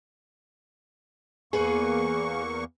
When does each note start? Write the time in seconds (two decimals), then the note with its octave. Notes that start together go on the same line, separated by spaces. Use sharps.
1.53 E2 A#3 G#4 B4 C#6